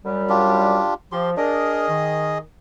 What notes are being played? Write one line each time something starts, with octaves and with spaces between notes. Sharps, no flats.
F#2 G3
D4 F4 G4
F3 G4 C6
D4 G#4 A#4 D#5
D#3